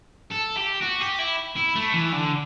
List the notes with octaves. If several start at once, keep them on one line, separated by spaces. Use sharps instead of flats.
A4
G4
F#4
G4
E4
E4
A3
E3
D3